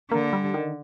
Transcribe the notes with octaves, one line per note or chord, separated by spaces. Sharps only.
D3 A#3
G3
D#3